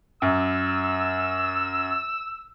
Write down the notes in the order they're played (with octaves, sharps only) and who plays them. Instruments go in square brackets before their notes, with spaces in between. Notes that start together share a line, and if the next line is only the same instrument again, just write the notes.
[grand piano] F#2 [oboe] E6